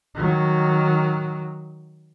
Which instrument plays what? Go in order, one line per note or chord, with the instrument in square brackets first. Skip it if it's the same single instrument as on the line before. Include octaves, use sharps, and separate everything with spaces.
[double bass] D#3 F#3